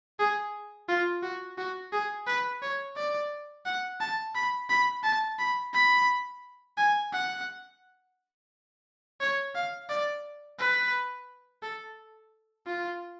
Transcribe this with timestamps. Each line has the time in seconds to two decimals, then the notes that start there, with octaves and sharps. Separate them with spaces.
0.19 G#4
0.88 F4
1.23 F#4
1.58 F#4
1.92 G#4
2.27 B4
2.62 C#5
2.96 D5
3.66 F#5
4.00 A5
4.35 B5
4.69 B5
5.04 A5
5.39 B5
5.73 B5
6.77 G#5
7.12 F#5
9.21 C#5
9.55 F5
9.89 D5
10.59 B4
11.63 A4
12.66 F4